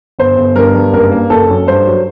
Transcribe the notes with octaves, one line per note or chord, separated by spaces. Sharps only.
G1 C5
G1
G2 A#4
G2
F#1 A#4
A#3
F#1 A4
F#2
G2 C5
F#3